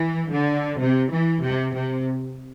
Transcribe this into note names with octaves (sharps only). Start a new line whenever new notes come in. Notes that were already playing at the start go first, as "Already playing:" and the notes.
Already playing: E3
D3
C3
E3
C3
C3